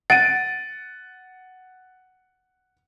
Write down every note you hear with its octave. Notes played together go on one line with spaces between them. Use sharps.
F#5 A6 D7 D#7